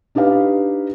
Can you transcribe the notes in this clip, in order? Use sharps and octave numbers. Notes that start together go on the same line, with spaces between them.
D4 D#4 G4 B4 F5